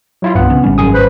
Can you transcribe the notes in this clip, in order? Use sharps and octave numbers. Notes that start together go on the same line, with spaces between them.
F#3 E4 F4
C2 G2 B3 F#5
C#3 C#4
G#1 G3 C#4
F#2 G#4 D#6
B4 C5